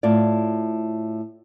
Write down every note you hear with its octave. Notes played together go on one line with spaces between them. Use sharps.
A2 F4 D5